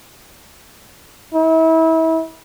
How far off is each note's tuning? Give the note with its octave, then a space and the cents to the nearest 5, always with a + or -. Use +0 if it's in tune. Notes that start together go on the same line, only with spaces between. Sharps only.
E4 -35